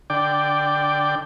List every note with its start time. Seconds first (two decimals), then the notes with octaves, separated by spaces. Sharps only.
0.10 D3 D5 G5